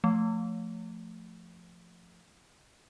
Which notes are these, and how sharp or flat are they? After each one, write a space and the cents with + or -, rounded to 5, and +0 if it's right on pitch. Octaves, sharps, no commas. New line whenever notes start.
F3 +0 A3 +10